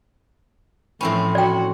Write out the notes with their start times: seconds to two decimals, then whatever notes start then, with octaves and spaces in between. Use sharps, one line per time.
1.01 A2 E3 F3 C4 C#4 E4 B5
1.35 F#4 D5 G5